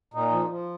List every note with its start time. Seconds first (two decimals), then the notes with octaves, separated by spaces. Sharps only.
0.14 A#2 D#4
0.31 F3
0.49 F3